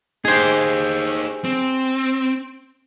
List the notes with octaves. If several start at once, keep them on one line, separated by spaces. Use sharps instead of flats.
D#4 G4 G#4 C5
C4